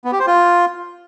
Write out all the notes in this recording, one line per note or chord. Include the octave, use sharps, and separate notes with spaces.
B3
G4
C5
F4